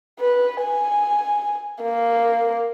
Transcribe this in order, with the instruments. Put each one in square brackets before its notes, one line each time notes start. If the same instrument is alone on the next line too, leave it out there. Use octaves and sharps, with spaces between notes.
[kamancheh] B4
G#5
A#3